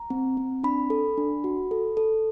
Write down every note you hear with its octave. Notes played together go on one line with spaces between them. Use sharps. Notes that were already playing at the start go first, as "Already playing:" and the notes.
Already playing: A#5
C4
C4
D4 B5
A4
D4
F#4
A4
A4